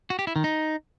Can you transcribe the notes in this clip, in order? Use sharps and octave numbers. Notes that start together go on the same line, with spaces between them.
F#4
G4
E4
D#3
D#4